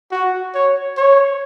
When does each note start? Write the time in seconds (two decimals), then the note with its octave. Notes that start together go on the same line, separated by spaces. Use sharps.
0.11 F#4
0.55 C#5
0.97 C#5